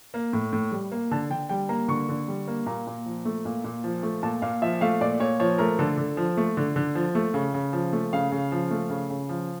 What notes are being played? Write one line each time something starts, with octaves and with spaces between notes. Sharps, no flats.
A#3
A2
A2
G3
A#3
D3 A5
D3 G5
G3 G5
A#3 A#5
D3 C#6
D3
G3
A#3
A#2 A#5
A#2
F3
A3
A#2
A#2
F3
A3
A#2 A5
A#2 F5
F3 E5
A3 F5
A#2 D5
A#2 C#5
F3 C#5
A3 A#4
D3 A4
D3
F3
A3
D3
D3
F3
A3
C#3
C#3
F3
A3
C#3 F5
C#3
F3
A3
C#3
C#3
F3